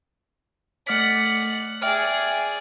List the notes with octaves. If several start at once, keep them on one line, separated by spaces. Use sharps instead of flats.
A3 D5 F#5 F6 B6
G#4 D5 E5 G5 F6